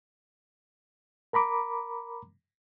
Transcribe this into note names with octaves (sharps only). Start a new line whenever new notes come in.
A#4 A#5 B5 D6